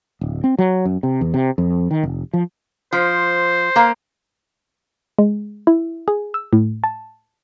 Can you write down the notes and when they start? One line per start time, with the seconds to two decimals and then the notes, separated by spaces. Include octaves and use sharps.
0.21 D1
0.44 C4
0.59 F#3
0.85 F#2
1.03 C3
1.21 E2
1.34 C3
1.58 F2
1.91 D#3
2.03 F1
2.33 F3
2.93 F3 C5
3.76 A#3 F5
5.19 G#3
5.67 E4
6.08 G#4
6.34 E6
6.53 A2
6.84 A5